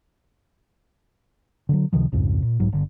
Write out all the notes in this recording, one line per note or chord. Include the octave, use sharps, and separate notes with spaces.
D3 E3 F#3
C#2 C3 D#3 F3
C2 F2 G#2 C#3
A#2
B1 G#2 F#3
G1 D3